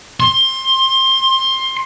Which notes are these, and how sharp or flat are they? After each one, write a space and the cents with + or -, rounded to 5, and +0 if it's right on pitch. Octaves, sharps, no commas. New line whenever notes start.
C6 +20